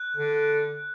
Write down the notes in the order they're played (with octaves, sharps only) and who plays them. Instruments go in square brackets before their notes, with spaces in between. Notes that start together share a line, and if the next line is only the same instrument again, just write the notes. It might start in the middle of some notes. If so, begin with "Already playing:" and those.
Already playing: [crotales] F#6
[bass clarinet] D3